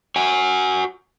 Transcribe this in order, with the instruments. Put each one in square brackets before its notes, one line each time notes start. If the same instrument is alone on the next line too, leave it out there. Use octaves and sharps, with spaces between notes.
[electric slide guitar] F#4 F#5 G#5